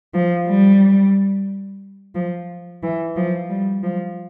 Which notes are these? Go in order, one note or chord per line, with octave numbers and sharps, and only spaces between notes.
F3
G3
F3
E3
F3
G3
F3